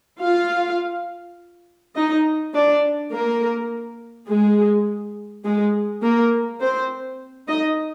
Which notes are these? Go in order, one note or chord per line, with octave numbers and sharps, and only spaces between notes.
F4 F5
D#4 D#5
D4 D5
A#3 A#4
G#3 G#4
G#3 G#4
A#3 A#4
C4 C5
D#4 D#5